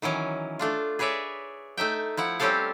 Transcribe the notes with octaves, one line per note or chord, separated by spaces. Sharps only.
D#3 E3 F#3 C#4
A3 D4 F4
G#4 B4 C#5 D5 E5
A3 D#4 E5 G5
F3 E4 F#5
G3 C4 C#4 G4 A4 F5